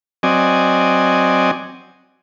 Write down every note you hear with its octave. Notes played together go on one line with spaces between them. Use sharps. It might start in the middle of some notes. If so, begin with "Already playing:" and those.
F#3 C4 D5 D#5 G#5